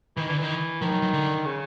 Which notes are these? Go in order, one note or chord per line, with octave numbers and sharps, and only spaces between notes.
D#3 E3
D3 E3
D#3 E3
D#3 F3
F#3
F#3
D3
C#3